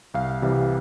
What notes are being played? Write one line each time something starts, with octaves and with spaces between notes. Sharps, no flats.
C2 F5
C3 E3 G3